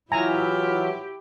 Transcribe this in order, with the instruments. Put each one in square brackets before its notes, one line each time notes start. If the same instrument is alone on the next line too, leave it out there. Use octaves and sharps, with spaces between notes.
[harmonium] E3 F#3 E5 [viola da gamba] E4 G4 [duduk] F4 [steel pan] G#5 A#5